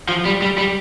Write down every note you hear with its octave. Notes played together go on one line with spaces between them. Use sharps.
F3
G3
G3
G3